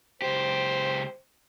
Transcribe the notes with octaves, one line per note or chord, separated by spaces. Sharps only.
C#2 G4 C5